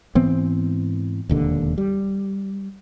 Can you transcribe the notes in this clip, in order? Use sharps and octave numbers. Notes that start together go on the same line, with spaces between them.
G#2 E3 B3 C4
E1 D#2 D3
G3